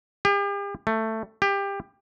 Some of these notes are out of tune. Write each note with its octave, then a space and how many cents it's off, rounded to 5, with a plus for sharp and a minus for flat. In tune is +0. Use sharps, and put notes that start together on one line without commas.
G4 +40
A3 +10
G4 +20